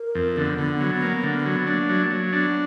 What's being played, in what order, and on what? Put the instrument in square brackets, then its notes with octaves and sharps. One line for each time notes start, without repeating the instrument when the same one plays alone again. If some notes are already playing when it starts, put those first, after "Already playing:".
Already playing: [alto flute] A#4
[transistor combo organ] F2
[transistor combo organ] D3 [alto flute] B3
[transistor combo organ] D3
F#3
A#3
D3
F#3
[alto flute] A#3 [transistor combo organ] D4
[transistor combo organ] F#3
[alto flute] G#3
A#3
[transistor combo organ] F#3
[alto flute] B3 [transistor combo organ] D4